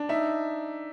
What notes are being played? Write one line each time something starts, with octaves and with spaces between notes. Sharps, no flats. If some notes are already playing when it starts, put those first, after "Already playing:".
Already playing: D4
D#4 E5